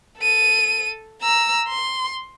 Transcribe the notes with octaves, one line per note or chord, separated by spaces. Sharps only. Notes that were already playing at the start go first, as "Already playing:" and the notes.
A4 D#7
A#5 E6
C6